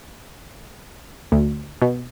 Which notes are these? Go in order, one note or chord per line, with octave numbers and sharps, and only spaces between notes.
D2
B2